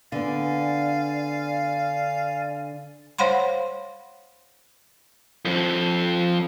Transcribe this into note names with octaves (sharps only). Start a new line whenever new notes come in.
D3 B3 D5 F5 G#5
C5 C#5 F5 F#5 B5 C6
F2 F3